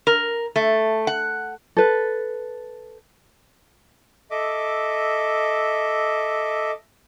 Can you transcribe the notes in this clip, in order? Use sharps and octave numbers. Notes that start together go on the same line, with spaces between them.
A#4
A3
F#5
A4 B4
A4 D#5 E5 D6